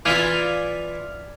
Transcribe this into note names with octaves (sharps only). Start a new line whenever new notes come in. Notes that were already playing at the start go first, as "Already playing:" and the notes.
E3 E4 F4 D5 F5 G#5